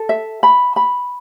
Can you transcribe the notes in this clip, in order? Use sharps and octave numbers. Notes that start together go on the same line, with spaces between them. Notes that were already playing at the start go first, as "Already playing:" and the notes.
Already playing: A4
E5
B5
B5